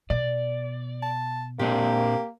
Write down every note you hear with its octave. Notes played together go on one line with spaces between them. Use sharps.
B2 D5
A5
A#2 A#3 C4 D4 G4